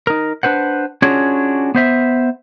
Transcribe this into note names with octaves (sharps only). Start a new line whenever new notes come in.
D#4 A#4
D4 B4 C5 F#5
C#4 D4 F4 F#4 G#4 C#5
B3 C5 E5